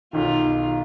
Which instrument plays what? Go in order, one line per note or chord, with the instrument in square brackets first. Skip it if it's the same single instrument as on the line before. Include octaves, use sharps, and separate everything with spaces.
[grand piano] B1 D#3 [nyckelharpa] F4